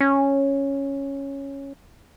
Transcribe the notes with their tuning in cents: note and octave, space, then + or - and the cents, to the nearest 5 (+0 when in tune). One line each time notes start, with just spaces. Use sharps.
C#4 -5